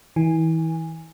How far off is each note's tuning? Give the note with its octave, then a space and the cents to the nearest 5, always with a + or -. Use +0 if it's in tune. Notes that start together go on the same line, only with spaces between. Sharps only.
E3 -35 G#5 -10